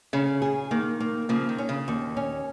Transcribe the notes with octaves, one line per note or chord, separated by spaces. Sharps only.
C#3 C#4
G#4
D#3 A#3
A#3
C#3 F3 A#3
D#3
C#4
C#3
D#2
C#4